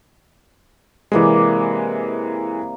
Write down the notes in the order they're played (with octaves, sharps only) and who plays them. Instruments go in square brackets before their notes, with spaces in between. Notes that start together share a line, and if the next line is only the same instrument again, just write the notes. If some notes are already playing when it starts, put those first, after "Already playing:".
[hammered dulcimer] C3 A#3 D5 [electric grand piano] E3 G#3